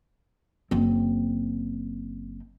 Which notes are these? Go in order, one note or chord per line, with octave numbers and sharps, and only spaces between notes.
F#1 C4